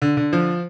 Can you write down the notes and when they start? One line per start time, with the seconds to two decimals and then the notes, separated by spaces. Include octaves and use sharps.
0.02 D3
0.17 D3
0.33 F3